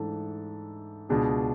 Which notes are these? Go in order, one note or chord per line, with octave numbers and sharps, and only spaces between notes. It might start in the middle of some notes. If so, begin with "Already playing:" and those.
Already playing: G#2 E3 A3 D4 A4
C#2 B2 G#3 D4 G#4